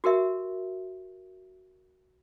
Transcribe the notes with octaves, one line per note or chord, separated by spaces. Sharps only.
F#4 G4 A#4 E5